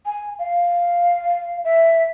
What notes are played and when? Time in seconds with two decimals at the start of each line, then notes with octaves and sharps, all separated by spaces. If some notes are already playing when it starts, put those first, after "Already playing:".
0.06 G#5
0.39 F5
1.64 E5